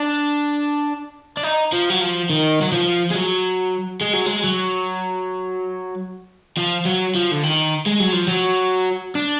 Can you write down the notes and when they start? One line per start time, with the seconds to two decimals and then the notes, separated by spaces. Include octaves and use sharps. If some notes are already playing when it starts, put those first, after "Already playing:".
Already playing: D4
1.37 D4
1.43 D#4
1.72 F3
1.90 F#3
2.01 F3
2.30 D#3
2.61 F#3
2.72 F3
3.10 G#3
3.15 F#3
4.01 G#3
4.13 F#3
4.26 G#3
4.44 F#3
6.57 F3
6.86 F#3
7.15 F3
7.31 D3
7.43 D#3
7.86 G#3
8.00 F#3
8.13 F3
8.27 F#3
9.15 D4